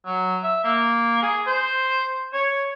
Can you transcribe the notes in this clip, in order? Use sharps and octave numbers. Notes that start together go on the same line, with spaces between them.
F#3
E5
A#3
G#4
C5
C#5